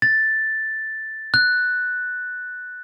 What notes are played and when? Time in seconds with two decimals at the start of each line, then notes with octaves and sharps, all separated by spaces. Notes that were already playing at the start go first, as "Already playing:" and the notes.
0.02 A6
1.34 F#6